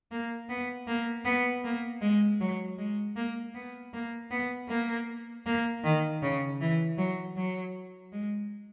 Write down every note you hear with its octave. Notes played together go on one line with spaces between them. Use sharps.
A#3
B3
A#3
B3
A#3
G#3
F#3
G#3
A#3
B3
A#3
B3
A#3
A#3
D#3
C#3
E3
F#3
F#3
G#3